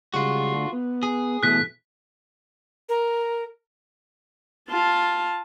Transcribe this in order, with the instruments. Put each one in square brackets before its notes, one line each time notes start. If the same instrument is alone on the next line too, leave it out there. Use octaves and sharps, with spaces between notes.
[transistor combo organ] C#3 G3 G#3 [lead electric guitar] F4 F#4
[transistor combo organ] D3 A3
B3
[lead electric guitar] G#4
[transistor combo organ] B2 E3 A3 [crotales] F#6 B6
[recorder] A#4
[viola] F4 A5